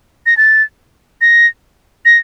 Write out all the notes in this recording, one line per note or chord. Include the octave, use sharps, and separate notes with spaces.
A#6
A6
A#6
A#6